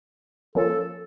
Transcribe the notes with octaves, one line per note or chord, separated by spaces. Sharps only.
F3 A#3 C#4 F4 A4